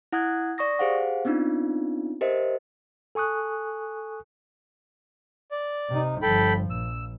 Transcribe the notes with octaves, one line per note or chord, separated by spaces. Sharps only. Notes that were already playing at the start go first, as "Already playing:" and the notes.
E4 F#5 D#6 F#6 G#6
D5 C#6 D#6 A#6
G4 G#4 C5 F5 F#5
B3 C4 D4 D#4 F4
G4 A#4 C5 D#5 E5
A4 G#5 C#6 D#6 F#6
D5
C3 D#4
G1 F3 A4 G5 B5
A#1 E6